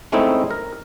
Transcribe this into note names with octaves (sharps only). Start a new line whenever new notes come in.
G#3 A3 C4 C#4 D#4 E4
A#4